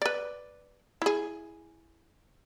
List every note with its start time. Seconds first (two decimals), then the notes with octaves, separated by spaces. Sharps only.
0.02 B4 D5
1.02 E4 G#4